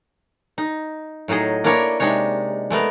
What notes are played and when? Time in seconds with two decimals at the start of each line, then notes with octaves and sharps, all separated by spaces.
0.58 D#4
1.28 A2 F#3 D#4 G#4 D#5
1.64 A#3 D4 E4 A#4 C#5 G#5
2.00 C3 G#3 D4 D#4 C#5
2.70 G#3 A3 B3 A#4